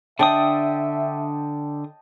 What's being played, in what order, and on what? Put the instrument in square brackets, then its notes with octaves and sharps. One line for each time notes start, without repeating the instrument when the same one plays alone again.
[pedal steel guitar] D3 D4 D#6 [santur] D#5 G5 A5 [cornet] E5